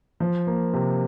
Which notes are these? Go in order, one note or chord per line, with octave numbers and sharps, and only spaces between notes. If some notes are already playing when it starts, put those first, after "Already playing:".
F3
A#3
C3